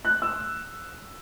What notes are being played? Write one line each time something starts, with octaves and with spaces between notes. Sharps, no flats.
F#6
E6